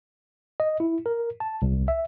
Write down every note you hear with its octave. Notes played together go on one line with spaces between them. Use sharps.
D#5
E4
A#4
A5
C2
E5